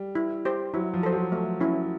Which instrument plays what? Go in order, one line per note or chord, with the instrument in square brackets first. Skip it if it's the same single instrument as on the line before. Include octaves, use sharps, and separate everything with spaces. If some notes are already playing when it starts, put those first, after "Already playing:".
Already playing: [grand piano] G3
[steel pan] E4
G4 C5
[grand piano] F#3 [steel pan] E4
[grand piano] F3
[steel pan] A4 C5
[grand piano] F#3
[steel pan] A3
C#4 E4